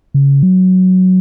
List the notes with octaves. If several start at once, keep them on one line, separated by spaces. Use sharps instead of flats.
C#3
F#3